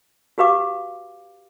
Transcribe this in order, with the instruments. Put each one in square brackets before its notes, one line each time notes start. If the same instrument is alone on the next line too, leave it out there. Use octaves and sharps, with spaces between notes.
[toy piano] F#4 G4 B4 F5 D6